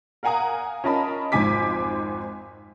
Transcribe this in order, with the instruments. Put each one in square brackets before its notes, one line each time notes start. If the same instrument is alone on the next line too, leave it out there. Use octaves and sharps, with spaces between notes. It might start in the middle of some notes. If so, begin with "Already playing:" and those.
[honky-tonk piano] A#4 F5 F#5 G#5 A#5 D#6
C#4 F4 A#4 D#5 A5 B5
G#1 F2 G#2 G#5 D6 B6